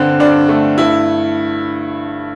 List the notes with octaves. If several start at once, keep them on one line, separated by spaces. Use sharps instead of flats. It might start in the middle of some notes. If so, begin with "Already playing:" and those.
Already playing: G2 D3 C4
G2 D4
A3
G2 E4